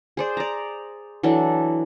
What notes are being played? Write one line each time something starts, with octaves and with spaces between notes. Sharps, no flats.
G#4 C5 D5
D5 A#5
E3 F#3 D4 A4